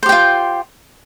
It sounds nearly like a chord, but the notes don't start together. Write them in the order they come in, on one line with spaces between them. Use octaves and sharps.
C5 G4 G5 F4